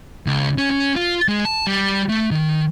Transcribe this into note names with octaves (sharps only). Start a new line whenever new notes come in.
C#2
C#4
C#4
F4
G#3
A5
G3
A3
D#3